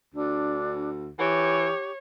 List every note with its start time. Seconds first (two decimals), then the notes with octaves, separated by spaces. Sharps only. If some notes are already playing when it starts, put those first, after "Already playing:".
0.14 D2 D4
1.19 E3 G4 C#5